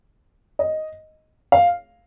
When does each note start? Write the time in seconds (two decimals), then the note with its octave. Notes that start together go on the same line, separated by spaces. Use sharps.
0.59 D#5
1.52 F5